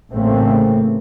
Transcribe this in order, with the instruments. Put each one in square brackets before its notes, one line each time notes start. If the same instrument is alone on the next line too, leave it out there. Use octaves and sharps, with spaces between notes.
[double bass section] A1 A2 C#3 A3 A#3 C4